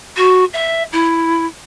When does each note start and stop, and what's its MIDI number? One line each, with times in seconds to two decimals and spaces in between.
0.17 0.44 66
0.53 0.83 76
0.92 1.46 64